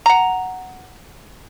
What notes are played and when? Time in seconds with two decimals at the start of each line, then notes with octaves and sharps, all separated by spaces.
0.06 F#5 A#5